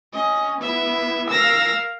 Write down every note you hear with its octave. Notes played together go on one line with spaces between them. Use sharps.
C#4 D#5
B3 E4 E5
A#4 F5 E6 A#6